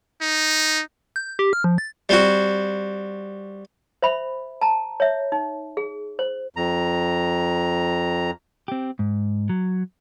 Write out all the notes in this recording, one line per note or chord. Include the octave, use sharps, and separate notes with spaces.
D#4
G6
G4
F6
F3
A6
G3 C4 F#4
C5 E5 B5
A5 A#5
C#5 E5
D#4
G#4
C5
F2 A#5
C4 G4
G#2
F#3